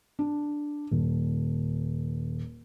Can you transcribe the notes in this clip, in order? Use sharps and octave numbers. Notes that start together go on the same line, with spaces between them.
D4
D#1